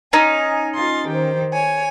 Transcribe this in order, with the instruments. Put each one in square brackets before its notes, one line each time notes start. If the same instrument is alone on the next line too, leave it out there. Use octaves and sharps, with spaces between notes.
[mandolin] C#4 D#4 [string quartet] G#5
[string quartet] F4 C6 A6
D#3 G4 C5
C#5 G#5